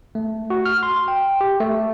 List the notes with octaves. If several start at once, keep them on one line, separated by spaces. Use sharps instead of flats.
A3
F#4
F6
C6
G5
G4
A3